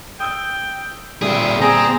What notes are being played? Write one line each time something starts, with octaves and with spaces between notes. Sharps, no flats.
G5 D#6 E6 G6
A#2 D3 G3 C4 G#4 E5
C4 G#4 A#5